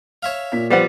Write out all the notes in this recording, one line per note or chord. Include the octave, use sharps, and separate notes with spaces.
C#5 E5 F5
A#2 B6
F3 G3 B3 C5 F#5 A6